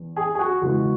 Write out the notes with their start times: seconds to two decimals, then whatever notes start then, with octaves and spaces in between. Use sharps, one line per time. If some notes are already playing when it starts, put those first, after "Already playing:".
Already playing: E2
0.16 G#4
0.35 G#4
0.39 F#4
0.61 E2 C#3 E3 G#3 F#4